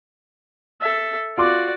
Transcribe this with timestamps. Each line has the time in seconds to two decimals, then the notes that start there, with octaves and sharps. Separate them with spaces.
0.81 A4 E5
1.38 F4 F#4 D5 C6 D6